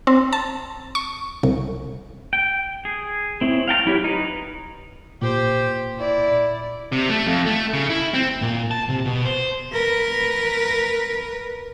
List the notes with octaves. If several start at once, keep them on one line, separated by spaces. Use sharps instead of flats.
C4
A5
C#6
C2
G5
G#4
C4 E4 C#5
F5 G5 A5 F6
F#3 E4 G4 C#5
D#4 B4
A#2 G4 C5
E4 D5
C3
A3
F2
A3
C#3
E4
C4
A#2
A5
C3
B2
C5
A#4 B4